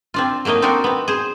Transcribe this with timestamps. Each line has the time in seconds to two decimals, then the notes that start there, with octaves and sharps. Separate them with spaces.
0.14 C4 D4 F4
0.45 F#3 A3 A#3 D#4 D#5
0.62 C4 D4 D#4 F#4 A#4
0.84 B3 C4
1.08 G#4 C5